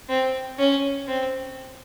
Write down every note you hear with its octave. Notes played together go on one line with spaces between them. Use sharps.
C4
C#4
C4